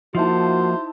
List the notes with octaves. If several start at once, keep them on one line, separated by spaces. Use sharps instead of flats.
F3 A#3 D#4 E4 F#4 C5 A5